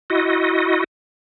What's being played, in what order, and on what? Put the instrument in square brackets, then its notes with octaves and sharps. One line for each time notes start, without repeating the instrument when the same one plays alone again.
[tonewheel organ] E4 F#4 D#5